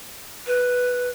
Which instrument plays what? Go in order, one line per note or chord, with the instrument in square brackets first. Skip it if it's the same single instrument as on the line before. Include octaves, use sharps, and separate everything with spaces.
[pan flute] B4